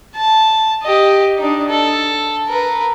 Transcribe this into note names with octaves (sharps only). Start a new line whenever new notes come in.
A5
G4 D#5
D4 D#4
A4
A#4 B4